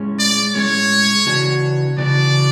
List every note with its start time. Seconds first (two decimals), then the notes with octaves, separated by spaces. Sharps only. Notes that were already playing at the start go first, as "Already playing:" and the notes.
Already playing: A2 G#3 C#4
0.19 D5
0.54 A2 G#3 C#4 C#5
1.26 C#3 E3 B3 D4 F#4
1.98 C#3 E3 B3 D4 F#4 D5